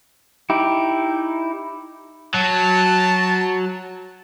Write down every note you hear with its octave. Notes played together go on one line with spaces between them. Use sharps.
D#4 E4 G4
F#3 A5